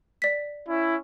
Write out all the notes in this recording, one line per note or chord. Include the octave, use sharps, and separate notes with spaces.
D5 B6
C#4 E4